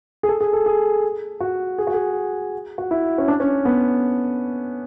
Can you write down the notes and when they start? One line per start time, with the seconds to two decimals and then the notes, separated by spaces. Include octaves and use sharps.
0.23 G#4
0.29 A4
0.41 G#4
0.53 A4
0.66 G#4
1.41 F#4
1.78 G#4
1.87 F#4
1.94 G#4
2.78 F#4
2.91 E4
3.18 C#4
3.28 D4
3.40 C#4
3.65 B3